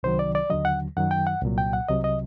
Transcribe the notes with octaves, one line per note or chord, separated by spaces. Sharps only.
C2 C3 D#3 F#3 C5
D5
D5
D#2 D3 F#3 D#5
F#5
F#2 D#3 F#3 F#5
G5
F#5
C2 A#2 F#3
G5
F#5
C2 C3 F#3 D#5
D#5